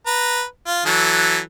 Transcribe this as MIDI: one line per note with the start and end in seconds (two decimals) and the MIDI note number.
0.06 0.43 71
0.06 0.43 82
0.67 0.82 65
0.86 1.39 52
0.86 1.39 54
0.86 1.39 69